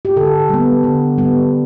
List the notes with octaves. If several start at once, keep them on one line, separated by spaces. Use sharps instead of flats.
G4
D3 A4
G3 B3
D3
G3 B3